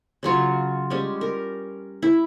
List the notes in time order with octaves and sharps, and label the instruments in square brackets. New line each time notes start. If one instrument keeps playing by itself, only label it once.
[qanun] C#3 F#3 F4 C#5
G3 G#3 C#4
A#4
E4